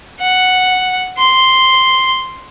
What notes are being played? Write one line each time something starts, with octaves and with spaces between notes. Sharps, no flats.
F#5
C6